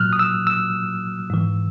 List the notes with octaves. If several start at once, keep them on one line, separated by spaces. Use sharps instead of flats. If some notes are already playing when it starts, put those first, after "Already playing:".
Already playing: A#2 F#3 F6 F#6
D#6
E6
E6
G#2 E3